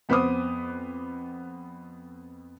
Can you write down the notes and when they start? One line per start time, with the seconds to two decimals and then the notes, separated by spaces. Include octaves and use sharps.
0.09 F2 B3 B4 C5 D6 D#6